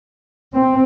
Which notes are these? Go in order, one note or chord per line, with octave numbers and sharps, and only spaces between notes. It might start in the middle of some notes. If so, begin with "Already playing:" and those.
C4